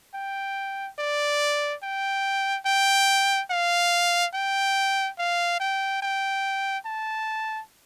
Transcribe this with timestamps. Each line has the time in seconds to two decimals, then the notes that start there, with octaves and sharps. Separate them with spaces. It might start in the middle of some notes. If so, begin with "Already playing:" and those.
0.14 G5
0.99 D5
1.83 G5
2.66 G5
3.51 F5
4.34 G5
5.19 F5
5.60 G5
6.02 G5
6.86 A5